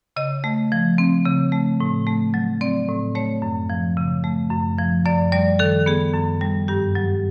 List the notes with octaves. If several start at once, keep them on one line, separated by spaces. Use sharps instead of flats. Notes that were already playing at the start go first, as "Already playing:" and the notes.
C#3 D#5
A3
F3
C4
C#3
A3
A2
A3
F#3
C4 D5
A2
A3 C#5
F#2
F3
C#3
A3
F#2
F3
F#2 D5
G3 D5
D#3 A4
B3 G#4
F#2
G3
G2 G4
F#3